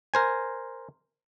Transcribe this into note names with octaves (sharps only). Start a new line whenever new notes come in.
A#4 C5 G#5